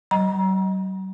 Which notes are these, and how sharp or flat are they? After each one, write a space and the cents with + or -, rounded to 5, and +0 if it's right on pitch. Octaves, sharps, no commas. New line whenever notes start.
F#3 +45 D#5 +0 A#5 +35